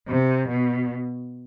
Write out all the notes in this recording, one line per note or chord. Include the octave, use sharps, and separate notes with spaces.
C3
B2